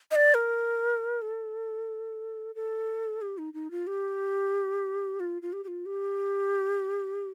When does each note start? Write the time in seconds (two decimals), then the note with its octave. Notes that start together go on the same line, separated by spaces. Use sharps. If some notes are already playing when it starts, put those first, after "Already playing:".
0.11 D#5
0.15 D5
0.34 A#4
1.22 A4
2.55 A4
3.21 G4
3.38 D#4
3.54 D#4
3.71 F4
3.87 G4
5.20 F4
5.42 F4
5.53 G4
5.64 G4
5.68 F4
5.86 G4